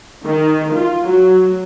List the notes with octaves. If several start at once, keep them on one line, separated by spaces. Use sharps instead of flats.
D#3
F4
F#3